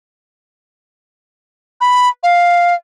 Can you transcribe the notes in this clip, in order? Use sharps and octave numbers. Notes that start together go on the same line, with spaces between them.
B5
F5